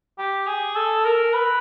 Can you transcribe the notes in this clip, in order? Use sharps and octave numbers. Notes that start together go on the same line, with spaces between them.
G4
G#4
A4
A#4
B4